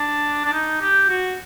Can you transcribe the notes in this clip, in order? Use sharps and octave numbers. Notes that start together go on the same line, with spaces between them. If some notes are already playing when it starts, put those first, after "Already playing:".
Already playing: D4
D4
D#4
G4
F#4